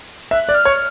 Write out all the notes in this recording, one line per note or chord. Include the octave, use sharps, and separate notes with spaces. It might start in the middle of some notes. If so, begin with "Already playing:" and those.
E5 F#6
F#6
D5
F6
C#5